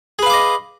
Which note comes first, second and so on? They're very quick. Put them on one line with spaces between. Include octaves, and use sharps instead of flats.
G#4 B4 F5 D6 D#5